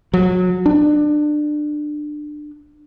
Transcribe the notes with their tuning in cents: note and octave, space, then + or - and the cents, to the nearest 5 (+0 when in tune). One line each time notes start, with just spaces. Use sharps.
F#3 -25
D4 +25